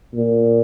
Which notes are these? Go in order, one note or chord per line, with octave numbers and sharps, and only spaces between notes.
A#2